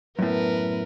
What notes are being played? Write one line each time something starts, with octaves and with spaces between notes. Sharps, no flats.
F#2 A2 B3 A#4 B4